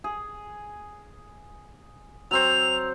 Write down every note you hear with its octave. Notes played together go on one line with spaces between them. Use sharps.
G#4
F#3 C4 C5 F7